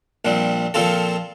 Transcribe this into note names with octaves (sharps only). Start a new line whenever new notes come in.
A#1 A#2 G3 C4
A#2 F3 C4 F4 A4